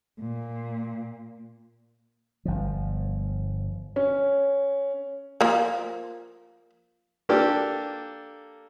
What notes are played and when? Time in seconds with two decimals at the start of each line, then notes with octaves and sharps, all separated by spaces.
0.20 A#2
2.45 G1 F3
3.96 C#4
5.41 F3 A#3
7.29 A#3 D4 G4 A4